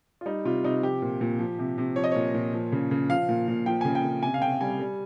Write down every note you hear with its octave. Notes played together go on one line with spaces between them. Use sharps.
F4
G3 D#4
C3 F4
C3 D#4
F3 G4
A#2
A#2
F3
C3
C3
F3 C#5
D#5
A#2 C#5
A#2
F3
C#3
C#3
F3 F5
A#2
A#2
F3 G5
C#3 G#5
G5
C#3
C3 G#5
F5
C3 G5
G3 G#5
G3